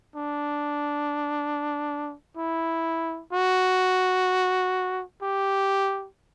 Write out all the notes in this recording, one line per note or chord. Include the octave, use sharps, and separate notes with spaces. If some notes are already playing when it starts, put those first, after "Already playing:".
D4
E4
F#4
G4